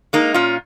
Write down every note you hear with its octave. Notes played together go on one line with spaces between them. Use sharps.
G#3 A#3 D#4
A#2 C#4 F4